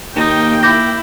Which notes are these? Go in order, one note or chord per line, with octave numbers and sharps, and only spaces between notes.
D#2 A#3 D#4 G5
E4 D6 G6 A#6